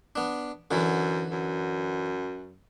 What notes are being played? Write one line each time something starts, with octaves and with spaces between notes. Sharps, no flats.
B3 D4
F#2 D3 E3
F#2